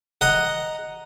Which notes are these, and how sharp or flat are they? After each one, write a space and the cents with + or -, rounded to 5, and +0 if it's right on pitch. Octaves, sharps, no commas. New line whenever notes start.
D#5 +0 F#5 +0 A#5 +0